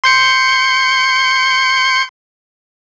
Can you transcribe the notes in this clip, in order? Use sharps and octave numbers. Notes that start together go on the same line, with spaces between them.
C6 G6 C#7